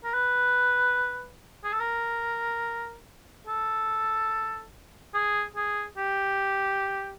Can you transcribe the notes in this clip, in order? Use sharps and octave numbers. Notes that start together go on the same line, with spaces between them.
A#4
B4
G#4
A4
A#4
A4
G#4
G#4
G4